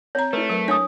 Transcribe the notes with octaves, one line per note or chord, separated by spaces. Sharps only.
C4 C#5 A#5
A3 E4 B4
F#3 A#4
D4 C#5 G#5 D#6